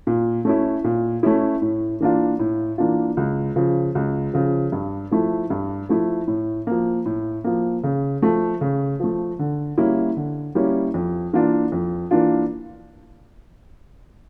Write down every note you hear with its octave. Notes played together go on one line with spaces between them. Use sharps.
A#2
A3 C#4 E4
A#2
A3 C#4 E4
A2
E3 A#3 D4 F4
A2
E3 A#3 D4 F4
C#2
C#3 F3
C#2
C#3 F3
G2
F3 A3 E4
G2
F3 A3 E4
A2
F3 A#3
A2
F3 A#3
C#3
F3 A3
C#3
F3 A3
D3
G3 A#3 C#4 E4
D3
G3 A#3 C#4 E4
F2
E3 A#3 D4 F4
F2
E3 A#3 D4 F4